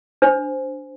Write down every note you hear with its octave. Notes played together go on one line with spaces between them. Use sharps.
D4 C5